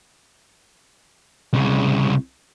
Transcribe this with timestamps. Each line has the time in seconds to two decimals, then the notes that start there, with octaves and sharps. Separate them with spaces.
1.53 C2 C#3